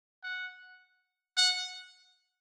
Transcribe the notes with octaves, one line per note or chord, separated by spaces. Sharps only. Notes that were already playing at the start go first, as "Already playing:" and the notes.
F#5
F#5